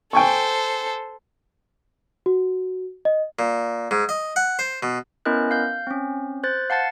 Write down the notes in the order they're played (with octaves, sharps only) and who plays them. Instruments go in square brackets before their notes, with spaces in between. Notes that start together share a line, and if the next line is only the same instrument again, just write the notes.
[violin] A4 C5 [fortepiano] G5 G#5 C#6
[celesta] F#4
D#5
[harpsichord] A#2
G#2
D#5
F#5
C5
B2
[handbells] B3 C#4 E4 A#4 D#5 F#6
F5 G6
C4 C#4
C5 F#6 A6
F5 F#5 A5 A6 C7